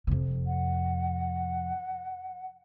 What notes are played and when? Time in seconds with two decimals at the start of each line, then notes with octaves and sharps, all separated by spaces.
0.07 F2 C3
0.47 F#5